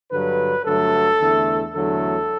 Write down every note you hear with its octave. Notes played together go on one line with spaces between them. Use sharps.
G2 D3 F#3 B4
G2 D3 F#3 A3 A4
E2 D3 A3
E2 D3 F#3 A3 A4